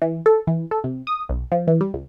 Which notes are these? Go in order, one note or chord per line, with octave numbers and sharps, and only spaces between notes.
E3
A4
E3
A4
C3
D#6
B1
F3
E3
G3
C#2